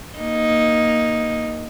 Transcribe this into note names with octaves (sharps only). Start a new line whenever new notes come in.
A#3 D#4